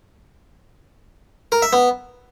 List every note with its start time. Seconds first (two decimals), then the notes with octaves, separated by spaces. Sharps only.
1.52 A#4
1.62 E5
1.73 B3